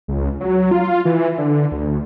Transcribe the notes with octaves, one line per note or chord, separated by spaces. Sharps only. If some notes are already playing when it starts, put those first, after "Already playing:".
C#2
F#3
F4
E3
D3
D2